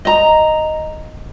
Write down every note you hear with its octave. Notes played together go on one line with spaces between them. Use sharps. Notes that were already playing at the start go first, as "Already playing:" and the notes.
D#5 A#5